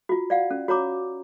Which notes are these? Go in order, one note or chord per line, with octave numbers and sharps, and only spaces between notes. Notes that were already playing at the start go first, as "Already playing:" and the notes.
F4 F#4
D5 F5 F#5
C#4
F#4 C#5 A#5 D6